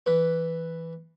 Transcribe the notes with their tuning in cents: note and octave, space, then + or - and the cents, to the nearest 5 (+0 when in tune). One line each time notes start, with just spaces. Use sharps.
E3 +0 B4 +0